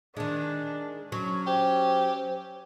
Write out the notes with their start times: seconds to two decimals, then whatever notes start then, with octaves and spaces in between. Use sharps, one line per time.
0.17 D#3 G#3 D4
1.12 F#3 C#4 C#6
1.46 G4 C5